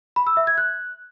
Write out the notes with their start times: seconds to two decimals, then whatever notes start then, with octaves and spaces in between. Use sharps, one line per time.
0.16 B5
0.27 E6
0.37 E5
0.47 G#6
0.58 F#6